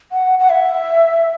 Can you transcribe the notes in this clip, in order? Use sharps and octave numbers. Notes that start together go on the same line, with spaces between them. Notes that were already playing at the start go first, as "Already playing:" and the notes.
F#5
F#5
E5